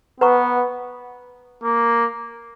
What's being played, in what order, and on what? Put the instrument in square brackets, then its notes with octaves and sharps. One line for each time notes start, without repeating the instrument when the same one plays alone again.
[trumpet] B3 [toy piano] B4 F#5 A#5 C#6
[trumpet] A#3